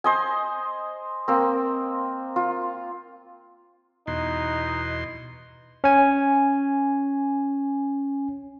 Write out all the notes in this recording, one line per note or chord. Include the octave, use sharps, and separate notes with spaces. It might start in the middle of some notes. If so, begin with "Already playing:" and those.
C5 D#5 G#5
A#3 C4
F4
E2 B2 D#4 C6
C#4 G#5